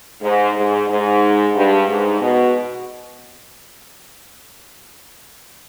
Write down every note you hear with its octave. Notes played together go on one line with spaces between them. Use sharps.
G#2
G#2
G#2
G2
G#2
B2